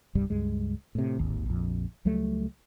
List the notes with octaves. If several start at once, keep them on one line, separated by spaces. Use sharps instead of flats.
E1 C2 G2 G3
C#2 G2 G#3
A2 C3
D1 G#1 D#2
A#1 F2
C#2 F#3 G3 A3